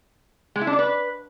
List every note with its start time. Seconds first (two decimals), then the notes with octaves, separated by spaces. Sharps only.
0.56 G#3
0.61 E4
0.67 D4
0.73 D5
0.79 B4